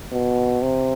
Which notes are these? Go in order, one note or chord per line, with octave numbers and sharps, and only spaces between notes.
B2
C3